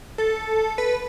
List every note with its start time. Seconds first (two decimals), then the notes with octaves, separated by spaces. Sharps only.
0.18 A4
0.78 B4